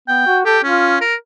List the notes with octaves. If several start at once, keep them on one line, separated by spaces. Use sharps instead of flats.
B3 G5
F#4
G4 A4
C#4 F4
A#4